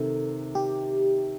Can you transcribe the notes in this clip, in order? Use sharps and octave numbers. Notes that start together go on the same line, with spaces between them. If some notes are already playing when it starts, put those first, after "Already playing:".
Already playing: C3 D#3 A4
G4